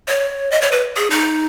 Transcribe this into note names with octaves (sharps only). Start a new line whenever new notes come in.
C#5
D#5
C#5
B4
G#4
D#4